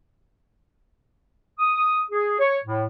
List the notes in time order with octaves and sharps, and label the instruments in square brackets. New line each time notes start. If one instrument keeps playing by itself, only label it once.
[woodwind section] D#6
G#4
C#5
A2